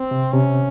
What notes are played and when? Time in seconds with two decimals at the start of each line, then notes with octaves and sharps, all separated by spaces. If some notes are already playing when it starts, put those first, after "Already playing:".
Already playing: C4
0.11 C3
0.34 C3 C#4